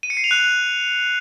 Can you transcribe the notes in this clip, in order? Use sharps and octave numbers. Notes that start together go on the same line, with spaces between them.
D#7
C#7
C7
F7
F#6